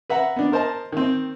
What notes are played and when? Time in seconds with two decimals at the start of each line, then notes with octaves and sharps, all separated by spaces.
0.10 B4 E5 F#5 A#5
0.36 B3 D4
0.52 A#4 C5 D#5 A5
0.92 D#3 C4